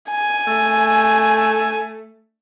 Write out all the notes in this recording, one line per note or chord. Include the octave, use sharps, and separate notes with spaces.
G#5
A3